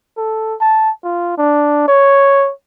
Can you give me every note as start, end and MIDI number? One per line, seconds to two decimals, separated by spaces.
0.18 0.55 69
0.61 0.90 81
1.04 1.37 65
1.38 1.83 62
1.88 2.51 73